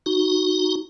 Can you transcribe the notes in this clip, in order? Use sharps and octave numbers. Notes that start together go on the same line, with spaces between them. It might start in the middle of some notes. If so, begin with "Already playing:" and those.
D#4 F#4